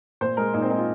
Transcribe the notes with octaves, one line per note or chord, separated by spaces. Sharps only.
A#2 C5
G#3 A#4
A#2 D#4
C4
G#3 D#4
F4